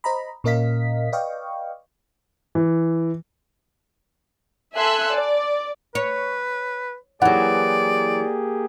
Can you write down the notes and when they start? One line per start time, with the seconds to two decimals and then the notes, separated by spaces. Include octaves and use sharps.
0.04 C5 D#5 A#5 B5
0.44 A#2 C#4 A#4 D#5 F5 B6
1.12 B4 D5 D#5 F5 G5 C#6
2.55 E3
4.76 A4 E5 G#5 C6 E6 F#6
5.14 D5
5.95 B4 C#5
7.22 E3 F#3 A#3 G4 G#4 D5 F#5